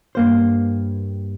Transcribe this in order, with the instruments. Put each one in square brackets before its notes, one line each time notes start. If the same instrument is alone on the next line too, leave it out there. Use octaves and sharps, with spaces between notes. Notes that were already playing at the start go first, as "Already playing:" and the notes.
[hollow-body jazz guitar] G2 A#3 C5